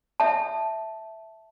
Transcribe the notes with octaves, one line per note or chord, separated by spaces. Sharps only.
E5 A5